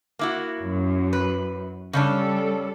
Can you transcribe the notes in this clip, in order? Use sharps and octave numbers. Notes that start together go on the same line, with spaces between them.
A#3 E4 F#4
F#2
B4
C#3 G3 C#4 D4 A4